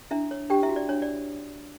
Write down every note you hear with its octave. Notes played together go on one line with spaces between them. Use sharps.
D4 E4 E5
C#5
D4 G4 G5
E4 E5
F#4
D5
D4 C#5
D5